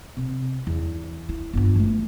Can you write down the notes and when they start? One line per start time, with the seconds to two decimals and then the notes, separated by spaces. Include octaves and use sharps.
0.17 C3
0.67 E2
1.29 E4
1.53 G1 F4
1.75 E3 A3